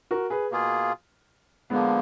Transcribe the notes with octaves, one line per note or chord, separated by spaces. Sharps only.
F#4 A#4
G#4 B4
B2 A#3 F4 G#4
D3 F3 G#3 A#3 B3